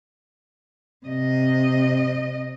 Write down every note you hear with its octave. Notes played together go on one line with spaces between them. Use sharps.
C3 D#5